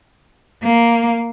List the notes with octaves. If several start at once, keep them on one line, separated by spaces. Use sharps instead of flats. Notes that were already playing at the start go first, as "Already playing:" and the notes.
A#3